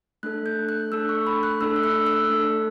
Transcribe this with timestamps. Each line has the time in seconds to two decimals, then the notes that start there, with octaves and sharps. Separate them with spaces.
0.23 A3 D4 A4 F#6
0.46 G6
0.69 F#6
0.92 A3 D4 A4 E6
1.09 C#6
1.27 B5
1.43 F#6
1.60 A3 D4 A4 E6
1.76 E6
1.84 F#6
2.06 E6
2.30 A3 D4 A4